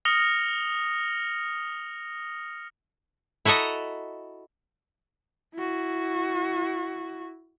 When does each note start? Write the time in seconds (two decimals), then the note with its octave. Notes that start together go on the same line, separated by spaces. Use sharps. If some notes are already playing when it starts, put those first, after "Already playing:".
0.05 D#6 F6 A#6 C#7 F7 G7
3.45 E4 F#4 A4 D#5 A#5
5.55 E4 F#4